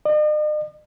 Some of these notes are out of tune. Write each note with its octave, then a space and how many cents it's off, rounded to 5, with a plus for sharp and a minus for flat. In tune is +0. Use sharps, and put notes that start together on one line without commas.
D#5 -45